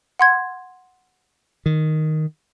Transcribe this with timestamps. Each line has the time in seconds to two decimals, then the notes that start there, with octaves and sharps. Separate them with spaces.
0.19 F#5 C6 G#6
1.66 D#3